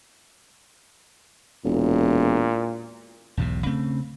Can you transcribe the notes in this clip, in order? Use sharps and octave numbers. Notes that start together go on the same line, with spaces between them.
E1 A#2
B1 E2 G#2 B2
C#3 A3 C4